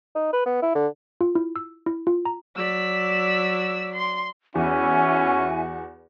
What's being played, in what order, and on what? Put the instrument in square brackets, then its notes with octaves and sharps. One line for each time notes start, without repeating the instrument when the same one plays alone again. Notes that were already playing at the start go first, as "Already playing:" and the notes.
[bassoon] D#4
B4
B3
E4
D3
[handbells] F4
E4
E6
E4
F4
A#5
[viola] F#3 D5 [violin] E6 B6
[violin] C6
[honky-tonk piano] E2 [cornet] C#4 [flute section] E4 E5 G#5 [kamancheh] F#4